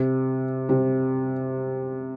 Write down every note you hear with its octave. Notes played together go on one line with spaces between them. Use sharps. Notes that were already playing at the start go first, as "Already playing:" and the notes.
Already playing: C3
C3